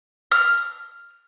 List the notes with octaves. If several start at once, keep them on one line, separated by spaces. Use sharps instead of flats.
F6